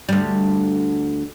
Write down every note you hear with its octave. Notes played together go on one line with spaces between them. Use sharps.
D2 G3